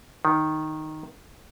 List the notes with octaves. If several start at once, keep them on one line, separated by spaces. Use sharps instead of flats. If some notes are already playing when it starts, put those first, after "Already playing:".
D#3